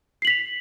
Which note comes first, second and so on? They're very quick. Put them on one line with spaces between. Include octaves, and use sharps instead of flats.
C7 F#7 B6 F7